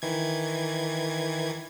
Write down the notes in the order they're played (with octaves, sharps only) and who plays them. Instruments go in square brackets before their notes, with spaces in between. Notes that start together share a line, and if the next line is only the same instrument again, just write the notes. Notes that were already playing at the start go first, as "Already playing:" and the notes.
[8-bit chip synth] D#3 E3 G#6